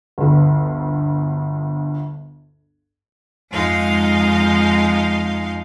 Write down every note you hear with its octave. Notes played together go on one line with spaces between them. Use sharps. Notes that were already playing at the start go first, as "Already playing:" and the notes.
G1 D2
F2 G#2 G#3 D#4 F5 C6